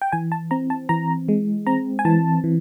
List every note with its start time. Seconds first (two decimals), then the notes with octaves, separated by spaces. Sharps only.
0.02 G5
0.12 E3 G#5
0.32 A5
0.51 C4 A#5
0.70 A5
0.89 E3 A#5
1.29 G#3
1.67 C4 A#5
1.99 G#5
2.05 E3 A5
2.44 E3